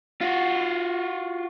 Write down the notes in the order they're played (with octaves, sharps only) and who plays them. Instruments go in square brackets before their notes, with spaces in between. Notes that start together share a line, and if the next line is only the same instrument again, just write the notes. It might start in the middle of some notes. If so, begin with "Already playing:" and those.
[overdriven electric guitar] F4 F#4